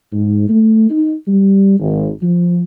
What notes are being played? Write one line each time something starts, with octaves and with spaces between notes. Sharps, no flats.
G#2
A3
D#4
G3
G#1
F3